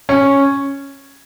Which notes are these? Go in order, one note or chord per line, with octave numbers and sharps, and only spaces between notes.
C#4